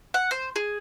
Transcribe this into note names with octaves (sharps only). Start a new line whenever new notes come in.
F#5
C5
G#4